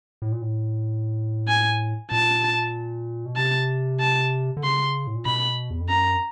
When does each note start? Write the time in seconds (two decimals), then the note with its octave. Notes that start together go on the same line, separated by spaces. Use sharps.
0.22 A2
0.32 A#2
0.42 A2
1.48 G#5
2.12 A#2 A5
3.25 B2
3.36 C3 A5
4.00 A5
4.57 D3
4.64 C#3 C6
5.07 A2
5.16 A#2
5.26 B2 B5
5.70 E2
5.81 F2
5.89 F#2 A#5